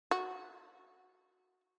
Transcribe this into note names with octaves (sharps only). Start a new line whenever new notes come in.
F#4